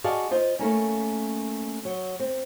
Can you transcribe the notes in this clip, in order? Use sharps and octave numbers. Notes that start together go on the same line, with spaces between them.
F#4 G#4 D5 D#5 F5 A5
F4 C5 D#5
A3 A#3 C#4
F#3
C4